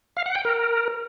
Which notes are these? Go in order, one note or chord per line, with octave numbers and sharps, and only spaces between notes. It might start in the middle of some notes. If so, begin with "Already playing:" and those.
F5
F#5
G5
A#4